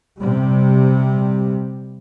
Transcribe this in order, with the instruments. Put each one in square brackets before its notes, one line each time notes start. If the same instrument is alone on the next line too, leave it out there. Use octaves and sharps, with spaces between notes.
[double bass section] C3 G3